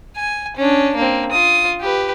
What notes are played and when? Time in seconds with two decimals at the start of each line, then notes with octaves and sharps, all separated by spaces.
0.17 G#5
0.56 C#4 D4
0.96 A#3 C4
1.31 F4 D#6
1.81 G4 B4